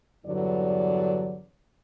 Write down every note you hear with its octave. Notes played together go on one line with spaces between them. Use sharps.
E2 G2 D3 F#3 D5